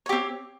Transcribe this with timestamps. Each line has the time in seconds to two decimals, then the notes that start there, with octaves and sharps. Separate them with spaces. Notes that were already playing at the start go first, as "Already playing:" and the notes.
0.06 C#5
0.09 G4
0.12 C4